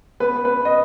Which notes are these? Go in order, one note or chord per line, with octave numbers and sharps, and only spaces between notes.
B3 B4
B3 B4
D#5